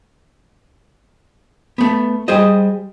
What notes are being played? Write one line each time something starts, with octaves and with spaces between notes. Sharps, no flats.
A3 B3
G3 G#4 C5 D#5